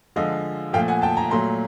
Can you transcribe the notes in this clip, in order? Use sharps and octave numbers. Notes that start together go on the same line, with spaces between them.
D3 F3 G#3 D#5 F5
A#2 F3 A3 F5 G5
F#5 G#5
G5 A5
G#5 A#5
A#2 F#3 A3 A#5 C6